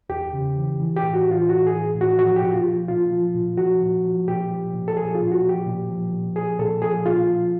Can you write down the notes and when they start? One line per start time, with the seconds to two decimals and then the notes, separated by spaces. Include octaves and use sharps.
0.09 E2 G4
0.33 C#3
0.56 E3
0.80 E3
0.97 G4
1.02 A2
1.14 F#4
1.26 E3
1.31 F4
1.49 A2 F#4
1.67 G#4
1.72 E3
1.95 A2
2.01 F#4
2.18 F3 F#4
2.36 G4
2.42 A#2 F#4
2.53 F4
2.65 F3
2.88 A#2 F4
3.11 F3
3.34 A#2
3.57 F3 F#4
3.81 A#2
4.04 F3
4.27 A#2 G4
4.51 F3
4.74 A#2
4.88 A4
4.96 F3 G#4
5.15 F4
5.20 A#2
5.32 F#4
5.43 F3
5.49 G4
5.66 A#2
5.90 F3
6.13 A#2
6.36 F3 G#4
6.59 A#2 A4
6.82 F3 G#4
7.06 A#2 F4
7.28 F3